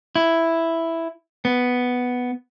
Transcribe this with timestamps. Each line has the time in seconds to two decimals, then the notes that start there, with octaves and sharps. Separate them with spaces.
0.16 E4
1.45 B3